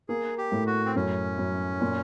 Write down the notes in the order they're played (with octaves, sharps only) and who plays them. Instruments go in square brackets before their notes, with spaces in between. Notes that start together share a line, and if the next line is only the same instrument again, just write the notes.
[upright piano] A#3 [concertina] G#4
[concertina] G4
[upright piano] A2
[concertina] F#4
C4
[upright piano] F#2 [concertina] C#4
[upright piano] F#2
A#2